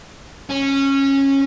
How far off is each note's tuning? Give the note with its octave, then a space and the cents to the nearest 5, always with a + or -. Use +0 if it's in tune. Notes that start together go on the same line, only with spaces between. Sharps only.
C#4 -15